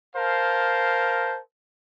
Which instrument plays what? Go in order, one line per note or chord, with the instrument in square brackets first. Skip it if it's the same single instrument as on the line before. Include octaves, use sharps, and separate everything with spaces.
[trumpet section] A#4 C5 F5 A5